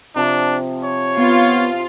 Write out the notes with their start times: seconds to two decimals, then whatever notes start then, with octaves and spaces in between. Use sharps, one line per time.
0.16 C3 F3 D4
0.84 C#5
1.17 B3 F4